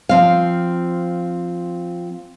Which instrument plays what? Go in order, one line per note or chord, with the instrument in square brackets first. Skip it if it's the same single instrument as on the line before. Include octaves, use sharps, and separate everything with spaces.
[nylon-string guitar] F3 C4 F5